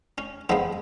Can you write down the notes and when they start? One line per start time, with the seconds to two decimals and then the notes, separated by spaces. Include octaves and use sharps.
0.18 C#4
0.49 F2 F3 G#3 B3 D#4